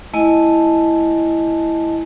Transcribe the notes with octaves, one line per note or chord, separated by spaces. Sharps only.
A3 E4 D#5 G#5 A5